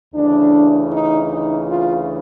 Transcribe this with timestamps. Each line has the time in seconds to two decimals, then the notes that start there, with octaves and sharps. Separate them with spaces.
0.14 D2 C#3 E3 D4
0.91 D#4
1.29 D#4
1.67 F4